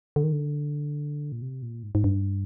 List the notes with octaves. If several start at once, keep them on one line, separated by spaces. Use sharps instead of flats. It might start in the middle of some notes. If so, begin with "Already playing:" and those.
D3
D#3
D3
A#2
C3
A#2
G#2
G#2
G2